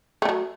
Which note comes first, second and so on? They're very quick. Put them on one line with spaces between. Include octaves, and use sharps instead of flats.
A3 D3 F#3